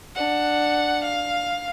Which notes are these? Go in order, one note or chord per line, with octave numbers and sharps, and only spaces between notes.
D4 F#5
F5